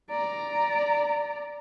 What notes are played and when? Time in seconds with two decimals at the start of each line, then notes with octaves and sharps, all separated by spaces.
0.10 D5 A#5